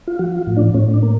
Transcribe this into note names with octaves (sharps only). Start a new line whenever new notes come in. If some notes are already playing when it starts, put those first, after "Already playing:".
F4
F3 F#4
F4
A2
D4
A2 C#4
D4
A#3